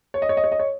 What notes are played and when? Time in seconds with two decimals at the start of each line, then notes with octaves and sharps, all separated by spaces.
0.14 C#5
0.22 D#5
0.29 C#5
0.37 D#5
0.44 C#5
0.52 D#5
0.59 C#5